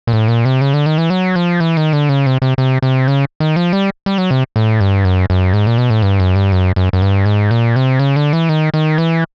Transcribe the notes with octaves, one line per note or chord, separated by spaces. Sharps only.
A#2
A2
A#2
C3
C#3
D3
D#3
E3
F#3
F3
E3
D#3
D3
C#3
C3
C3
C3
C3
C#3
D#3
F3
G3
G3
F#3
C3
A2
G2
F#2
F#2
G#2
A#2
B2
A2
G2
F#2
G2
F#2
F#2
F#2
G2
G#2
A#2
C3
C#3
D3
E3
D#3
D#3
E3